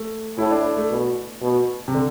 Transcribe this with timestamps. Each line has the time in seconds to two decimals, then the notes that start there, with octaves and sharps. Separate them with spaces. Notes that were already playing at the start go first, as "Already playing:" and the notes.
Already playing: A3
0.38 A2 E4
0.51 D4
0.77 A3
0.91 B2
1.42 B2
1.88 C3
1.94 D3